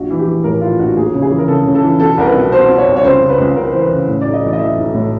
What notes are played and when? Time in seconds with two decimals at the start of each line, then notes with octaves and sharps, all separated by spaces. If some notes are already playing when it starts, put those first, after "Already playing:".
Already playing: A#1 F#4
0.10 E3
0.19 G4
0.27 E3
0.44 A2 A#4
0.61 E3 F4
0.79 A#1 F#4
0.96 D#2 G#4
1.14 C#3
1.22 G#4
1.31 E3
1.38 A#4
1.48 C#3 A4
1.65 C#3
1.75 A4
1.83 E3
2.00 B2 A4
2.18 C2 A#4
2.26 B4
2.34 B2
2.52 B2 C5
2.69 B2
2.78 C#5
2.87 C2
2.97 C#5
3.04 C#2 C5
3.21 C#3
3.29 B4
3.38 C#2
3.55 C#2 A#4
3.73 E3 C5
3.81 B4
3.91 C#3
4.08 A2
4.21 B1 D5
4.33 D#5
4.42 E3 D5
4.53 D#5
4.59 E3 E5
4.77 B1
4.94 A2